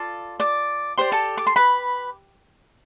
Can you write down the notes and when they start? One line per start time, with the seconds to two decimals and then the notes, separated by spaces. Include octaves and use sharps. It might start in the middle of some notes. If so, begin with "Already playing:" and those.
Already playing: F4 A4 D5 A5
0.40 D5 D6
0.98 G4 C5 D5 C6
1.12 A4 A5
1.37 D6
1.47 C6
1.56 B4 B5